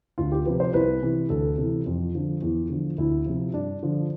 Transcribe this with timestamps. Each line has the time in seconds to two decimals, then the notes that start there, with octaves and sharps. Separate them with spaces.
0.18 D2 F4
0.32 G4
0.46 C3 F3 B4
0.60 C5
0.74 C2 B4
1.03 C3 E3
1.30 D2 A4
1.58 C3 E3
1.86 F2 F4
2.15 D3 F3
2.42 E2
2.69 D3 F3
2.98 D2 E4
3.26 C3 F3
3.53 G2 D4
3.83 D3 F3